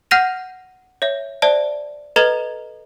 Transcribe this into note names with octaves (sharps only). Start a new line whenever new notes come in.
F#5 F6 G6 A#6 D#7 F7
C#5 E5
C5 D5 E5 A5
A4 B4 D#5 A#5 G#6 G7